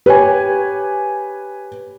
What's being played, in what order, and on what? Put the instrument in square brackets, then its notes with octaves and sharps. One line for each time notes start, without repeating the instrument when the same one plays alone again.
[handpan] G4 C#5 [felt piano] B4 G#5